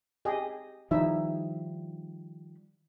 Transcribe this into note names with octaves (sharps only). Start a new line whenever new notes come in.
G4 G#4 D#5
D#3 F3 G3 D#4 E4 E5